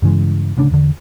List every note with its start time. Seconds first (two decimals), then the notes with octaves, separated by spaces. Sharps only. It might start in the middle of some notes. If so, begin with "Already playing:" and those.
0.02 G2 C#3 E3 G#3
0.57 D1 D2 C#3 D4
0.71 E2 D3